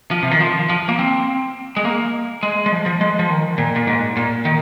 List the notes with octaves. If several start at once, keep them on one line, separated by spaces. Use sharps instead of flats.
F3
C3
D#3
F3
F3
A#3
C4
G#3
A#3
G#3
G#3
F3
F3
G#3
F3
D#3
A#2
A#2
G#2
A#2
D#3